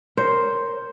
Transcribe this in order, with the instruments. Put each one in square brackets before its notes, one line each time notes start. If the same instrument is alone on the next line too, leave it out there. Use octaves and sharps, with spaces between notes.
[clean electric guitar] A#4 C#5 [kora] C5